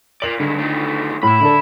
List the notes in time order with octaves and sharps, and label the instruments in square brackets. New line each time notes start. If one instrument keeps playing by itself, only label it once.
[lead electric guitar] A#4 D5 [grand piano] F#7
[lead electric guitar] G2 G#3 [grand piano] D3
[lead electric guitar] D#3 A3
[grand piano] A2 [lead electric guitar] E5 B5
[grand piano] D3 D4 A4